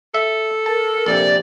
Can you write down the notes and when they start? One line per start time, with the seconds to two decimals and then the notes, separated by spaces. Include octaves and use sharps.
0.14 A4 E5
0.66 A#4 A5
1.06 A#1 C3 D5